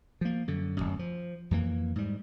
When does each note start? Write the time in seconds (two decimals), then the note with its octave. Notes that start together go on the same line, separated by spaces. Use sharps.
0.21 F3 A#3
0.48 F#2 D3
0.77 D1 G1 F#2
0.99 F3
1.51 F2 E3 A#3
1.96 G#2 G3